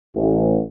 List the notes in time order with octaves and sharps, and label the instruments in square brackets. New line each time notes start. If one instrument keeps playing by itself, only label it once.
[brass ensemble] A1